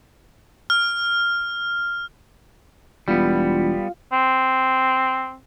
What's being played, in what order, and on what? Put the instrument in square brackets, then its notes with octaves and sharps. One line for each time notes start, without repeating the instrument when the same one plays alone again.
[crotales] F6
[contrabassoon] E1 [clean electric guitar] G3 B3 [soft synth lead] F4
[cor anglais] C4